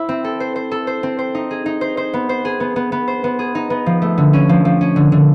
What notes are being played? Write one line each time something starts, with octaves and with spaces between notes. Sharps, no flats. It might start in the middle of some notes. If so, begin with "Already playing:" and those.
Already playing: E4 C5
C4
A4
C5
C5
A4
C5
C4
C5
D#4
G#4
D#4
C5
C5
B3
C5
G#4
B3
B3
B3
C5
B3
G#4
D#4
B3
F3
A3
D3
C#4
F3
F3
C#4
D3
D3